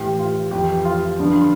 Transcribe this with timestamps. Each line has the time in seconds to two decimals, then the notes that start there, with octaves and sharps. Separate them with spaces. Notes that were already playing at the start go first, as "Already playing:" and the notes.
Already playing: A2 E3 G4
0.19 F4
0.51 F2 E3 G4
0.85 F4
1.19 G2 D3 F3